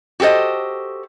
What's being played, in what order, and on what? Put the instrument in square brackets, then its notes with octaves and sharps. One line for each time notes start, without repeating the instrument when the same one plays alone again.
[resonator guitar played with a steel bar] F#4 G4 A4 C5 D#5